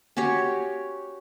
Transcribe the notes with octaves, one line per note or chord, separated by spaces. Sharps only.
C#4 F#4 G4 C#5